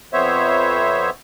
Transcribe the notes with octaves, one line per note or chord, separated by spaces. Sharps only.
F2 B3 C5 C#5 E5